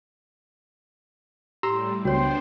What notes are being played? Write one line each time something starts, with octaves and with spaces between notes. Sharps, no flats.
A2 G3 G4 A#5 C6 E6
C#2 B3 D4 F#4 C5 C#5 G5 C6